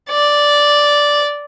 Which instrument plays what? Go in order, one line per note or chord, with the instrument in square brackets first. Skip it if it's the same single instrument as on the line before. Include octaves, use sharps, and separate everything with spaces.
[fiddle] D5